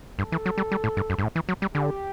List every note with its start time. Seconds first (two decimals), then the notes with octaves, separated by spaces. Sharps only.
0.19 G2 A4
0.32 E3
0.46 F#3
0.58 G3
0.72 G3
0.84 A2
0.97 G2
1.10 F#2
1.18 G2
1.23 A2
1.36 E3
1.49 F#3
1.62 G3
1.75 D3 G4